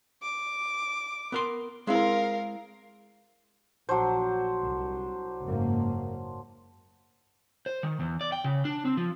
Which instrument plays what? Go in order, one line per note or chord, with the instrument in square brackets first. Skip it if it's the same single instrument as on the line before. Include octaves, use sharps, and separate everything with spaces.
[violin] D6
[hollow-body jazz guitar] B3 A#4 C6
[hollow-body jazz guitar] G#3 C4 E4 [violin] A#4 F5
[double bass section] A#1 [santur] F#3 D4 C5
[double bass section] C2
F#1 G#2 A#3
[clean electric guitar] C5
D#3
E2
D5
G5
C#3
D4
C4
F3